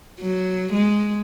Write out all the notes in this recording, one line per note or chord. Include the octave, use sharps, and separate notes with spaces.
F#3
G#3